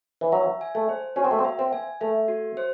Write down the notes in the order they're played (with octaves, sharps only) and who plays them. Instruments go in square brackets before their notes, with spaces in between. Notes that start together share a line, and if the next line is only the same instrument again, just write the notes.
[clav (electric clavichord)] E3
[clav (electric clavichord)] F#3 [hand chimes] E5
[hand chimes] G#5
[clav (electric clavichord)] A3
[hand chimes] C5
[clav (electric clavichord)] C#4 [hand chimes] F#4
[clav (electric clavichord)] C4
A3
C4
[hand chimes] E5
[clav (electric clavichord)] C4
[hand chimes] G#5
[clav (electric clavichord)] A3 [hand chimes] E5
[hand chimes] F#4
C5